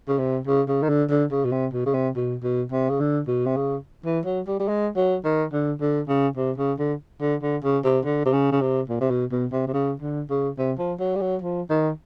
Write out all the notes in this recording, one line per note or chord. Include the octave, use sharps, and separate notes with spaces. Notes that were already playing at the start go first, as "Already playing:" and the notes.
C#3
C3
C#3
C#3
D#3
D3
D3
C#3
B2
C3
B2
C#3
C3
B2
B2
C3
C#3
D3
B2
C3
C#3
E3
F#3
G3
G3
G#3
F#3
D#3
D3
D3
C#3
C3
C#3
D3
D3
D3
C#3
C3
D3
C3
C#3
C#3
C3
A#2
C3
B2
B2
C3
C3
C#3
D3
C#3
C3
F3
F#3
G3
F#3
F3
D#3